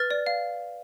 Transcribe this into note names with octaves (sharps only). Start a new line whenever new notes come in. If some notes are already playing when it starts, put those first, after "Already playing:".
Already playing: B4 F6 A6
D5
F5